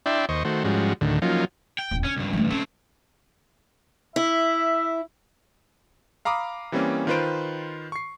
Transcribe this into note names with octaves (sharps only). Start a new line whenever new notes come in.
D4 E4 D5 E5 G5 C6
D#2 C5 D#5 C#6
D#3 A3 F#4 C5
G#2 F3 G3 G#3 C#4 F#4
D2 A2 D3 D#3
F3 F#3 A#3 C#4 D#4 F4
G5
D#1 E2
D3 C#4
C#2 G2
E3 A3
A3 C4 C#4
E4 E5
F5 A#5 B5 D6 D#6
E3 G3 A#3 C4 C#4
D#3 F4 B4 C5 D7
C#6 C7